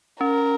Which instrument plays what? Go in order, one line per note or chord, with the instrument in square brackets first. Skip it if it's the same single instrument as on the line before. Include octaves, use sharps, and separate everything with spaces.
[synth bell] C#4 [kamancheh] A#4